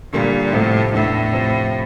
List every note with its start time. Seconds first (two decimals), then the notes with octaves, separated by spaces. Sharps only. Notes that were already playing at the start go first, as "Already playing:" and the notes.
0.13 A#2 D3 G3 A#3
0.53 A2 C3 F3 A3
0.93 E2 A2 E3 A3 D4
1.32 C3 F3 C4 E4